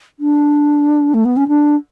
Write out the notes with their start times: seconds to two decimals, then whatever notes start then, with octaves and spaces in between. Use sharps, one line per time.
0.20 D4
1.14 A3
1.25 B3
1.37 C#4
1.48 D4